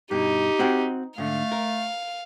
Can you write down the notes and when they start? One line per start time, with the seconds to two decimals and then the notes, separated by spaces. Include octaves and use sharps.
0.11 G2 B2 D#4 G4
0.59 C4 F#4 G5
1.18 G#2 D3 A3 F5
1.52 A#4